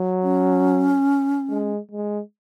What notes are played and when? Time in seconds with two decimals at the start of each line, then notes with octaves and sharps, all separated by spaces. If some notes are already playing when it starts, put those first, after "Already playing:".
Already playing: F#3
0.23 C#4
1.50 G#3
1.91 G#3